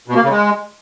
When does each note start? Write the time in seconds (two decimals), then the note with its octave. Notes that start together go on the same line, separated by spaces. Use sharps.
0.08 B2
0.15 A#3
0.22 C#3
0.30 G#3